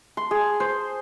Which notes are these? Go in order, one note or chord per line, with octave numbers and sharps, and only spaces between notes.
C6
G#4
C5